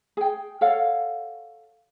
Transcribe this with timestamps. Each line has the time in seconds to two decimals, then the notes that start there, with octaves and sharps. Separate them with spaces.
0.17 G#4 G5
0.61 A4 C#5 F5 F#5